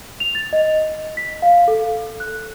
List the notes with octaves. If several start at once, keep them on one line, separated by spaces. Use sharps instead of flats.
F7
A6
D#5
B6
F5
A4
F#6